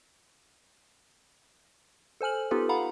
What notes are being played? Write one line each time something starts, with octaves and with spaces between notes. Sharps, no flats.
A4 C5 G#5 F6 F#7
B3 D#4 F4 G4 A4 B4
F5 F#5 A#5 B5